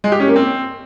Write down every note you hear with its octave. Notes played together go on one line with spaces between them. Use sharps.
G#3
G4
C#4
A#3
C4